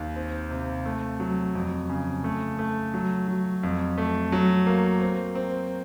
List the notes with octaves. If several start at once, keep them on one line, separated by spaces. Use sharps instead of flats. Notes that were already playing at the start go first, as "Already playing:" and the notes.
Already playing: D#2
C4
C3
A3
F#3
F2
C#3
A3
A3
F#3
F#3
F2
A3
F#3
A#3
C4
C4